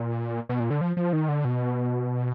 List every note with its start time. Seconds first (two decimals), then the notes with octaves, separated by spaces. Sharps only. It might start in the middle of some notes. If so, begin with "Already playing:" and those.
Already playing: A#2
0.49 B2
0.60 A#2
0.70 D3
0.81 F3
0.97 F3
1.13 D#3
1.29 D3
1.45 B2